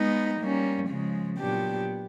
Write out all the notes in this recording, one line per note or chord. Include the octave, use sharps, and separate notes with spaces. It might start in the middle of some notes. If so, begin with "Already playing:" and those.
Already playing: G#3 B3 D#4
G3 A#3 C#4
C#3 F3 G#3
A#2 F#3 B3 D4 G4